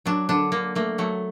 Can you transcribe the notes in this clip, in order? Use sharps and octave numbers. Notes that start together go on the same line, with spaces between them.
F#3 D4
D3 D4
D3 A#3
A3 A#3
F#3 A3